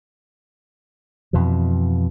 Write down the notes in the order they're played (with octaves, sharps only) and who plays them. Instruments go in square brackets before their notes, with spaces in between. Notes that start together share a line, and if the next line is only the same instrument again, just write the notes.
[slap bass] F2 B2 E3